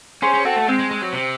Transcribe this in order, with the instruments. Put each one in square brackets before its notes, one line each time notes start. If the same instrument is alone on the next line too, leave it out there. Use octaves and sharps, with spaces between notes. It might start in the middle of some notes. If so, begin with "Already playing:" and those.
[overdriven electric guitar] C#4 [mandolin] G#4 C5
[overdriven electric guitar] C#4
[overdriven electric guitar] C4 [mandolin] F#4 A4
[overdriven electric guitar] A3
[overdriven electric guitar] G#3 [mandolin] C4
[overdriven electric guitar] G#3
G#3
F#3
C3